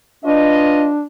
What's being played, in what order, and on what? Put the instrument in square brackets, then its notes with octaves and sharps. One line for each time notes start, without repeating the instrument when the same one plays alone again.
[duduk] D4 [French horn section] F4 B4 D#5